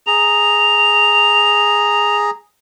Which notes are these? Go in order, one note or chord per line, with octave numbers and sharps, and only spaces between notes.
G#4 A#5 F7